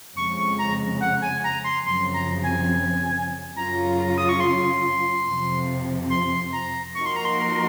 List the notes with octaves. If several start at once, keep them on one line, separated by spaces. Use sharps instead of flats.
F2 C#3 G#3 C#6
C#6
A#5
F#5
G#5
A#5
C6
F#2 C#3 F3 C4 C6
A#5
G#5
F#2 C#3 F#3 C#4 F4 A#5
D#6
C#6
C6
F2 C3 F3
C6
A#5
F3 A#3 D#4 F#4 A#4 C#6
C6
A#5
C6